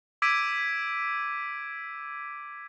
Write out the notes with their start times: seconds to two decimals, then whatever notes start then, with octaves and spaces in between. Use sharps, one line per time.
0.22 D6 E6 G#6 B6 D7 D#7